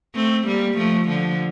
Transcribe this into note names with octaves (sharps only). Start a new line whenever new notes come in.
A3 C4
G3 A#3
F3 A3
D3 F3